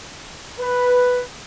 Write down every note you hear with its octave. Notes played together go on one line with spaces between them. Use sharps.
B4